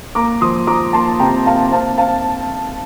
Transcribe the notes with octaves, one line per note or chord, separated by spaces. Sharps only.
A#3 A#5 D6
F3 C6 D#6
F3 A#5 D6
A#3 A5 C6
C3 G5 A#5
A#3 F5 A5
C4 F5 A5
C4 F5 A5